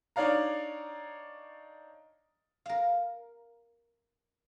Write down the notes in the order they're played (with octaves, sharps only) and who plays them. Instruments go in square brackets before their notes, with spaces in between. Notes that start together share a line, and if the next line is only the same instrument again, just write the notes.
[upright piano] D4 D#4 C#5 D5 F5 A#5
[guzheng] A#4 F5